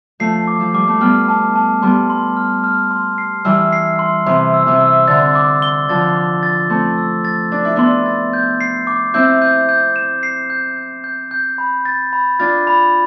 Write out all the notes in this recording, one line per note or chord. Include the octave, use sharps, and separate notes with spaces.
F3 A3 C7
D6
F3
G3 D6
A3
G3 B3 F6
A5
A5
G3 B3 C6
C6
F6
F6
C6
C7
E3 G3 E6
C7
C6
C3 E3 C6
E6
C3 E3
E6
D3 A6
D6
G7
D3 F3 A6
D6
A6
A3 C4 C6
E6
A6
D4 A6
E4
B3 D4 C6
A6
G6
C7
D6
C4 E4 G6
G6
G6
E7
C7
G6
G6
G6
G6
B5
A6
B5
D4 F4 A6
B5